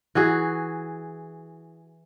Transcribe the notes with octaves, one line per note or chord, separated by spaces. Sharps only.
E3 F#4 G#4